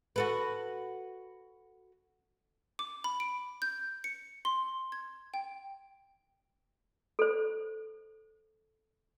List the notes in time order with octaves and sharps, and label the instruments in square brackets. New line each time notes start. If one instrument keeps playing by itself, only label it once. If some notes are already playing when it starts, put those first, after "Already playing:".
[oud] F#4 A4 B4
[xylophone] D6
B5
D7
G6
C#7
C6
G#6
G5
[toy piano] A4 C5